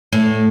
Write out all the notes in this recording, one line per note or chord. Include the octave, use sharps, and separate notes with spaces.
A2